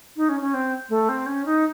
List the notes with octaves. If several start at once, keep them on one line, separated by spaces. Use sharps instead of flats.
D#4
C#4
C#4
C4
A3
C4
C#4
D#4